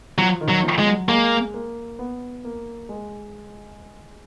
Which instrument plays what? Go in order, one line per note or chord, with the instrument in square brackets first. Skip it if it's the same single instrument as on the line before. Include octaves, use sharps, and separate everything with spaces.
[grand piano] F3 [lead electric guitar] F#3
[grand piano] D#3
[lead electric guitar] F#3
[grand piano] F3
[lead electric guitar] G#3
[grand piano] F#3
[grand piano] G#3 [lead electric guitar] A#3
[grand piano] A#3
B3
A#3
G#3